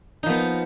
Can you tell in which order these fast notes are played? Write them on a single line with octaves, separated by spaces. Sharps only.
D#4 F3 B3